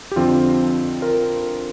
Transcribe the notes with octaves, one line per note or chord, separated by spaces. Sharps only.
G4
F2 D3 F3 C4 F4
F4 A#4